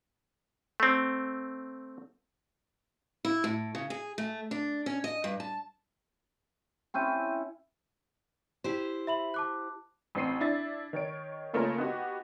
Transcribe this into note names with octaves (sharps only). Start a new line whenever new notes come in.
A3 C4
E4
A2
C#3
G#4
A3
D4
C#4
D#5
G2
A5
C4 C#4 E4 G5 G6 D#7
E4 G4 C5
E5 B5 F#7
A5 D6 F#6
A1 C4 C7 D#7
D4 E4 A6
D#3 C#5 D7
C#3 A3 A#3 C#4 F4 A#4
B3 D#4 F#4 G4